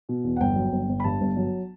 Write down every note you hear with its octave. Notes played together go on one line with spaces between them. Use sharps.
B2
E2
F#5
G1 G5
F#3
G1
G1
B5
G2 A5
G1
F#3